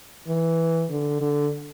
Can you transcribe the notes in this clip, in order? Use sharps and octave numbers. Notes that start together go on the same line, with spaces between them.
E3
D3
D3